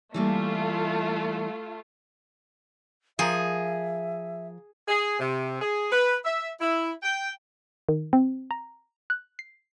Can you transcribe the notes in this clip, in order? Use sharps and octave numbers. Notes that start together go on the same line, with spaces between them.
E3 G3 A3 A#3 F4
F3 G#4 A#4 E5
G#4
C3
G#4
B4
E5
E4
G5
D#3
C4
A#5
F#6
C7